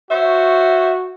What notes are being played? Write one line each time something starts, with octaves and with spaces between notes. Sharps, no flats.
F#4 C5 C#5 E5